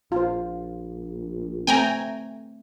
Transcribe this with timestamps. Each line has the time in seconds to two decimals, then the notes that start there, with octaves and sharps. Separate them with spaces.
0.12 A#1 F4 C5
1.67 A3 C4 G5 G#5 A#5